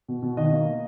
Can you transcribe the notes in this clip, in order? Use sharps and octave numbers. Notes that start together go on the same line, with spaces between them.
B2
B2
D#3 D#5
A#3